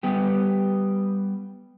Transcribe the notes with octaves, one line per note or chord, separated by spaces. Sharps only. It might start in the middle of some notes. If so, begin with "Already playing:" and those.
G3 B3 G4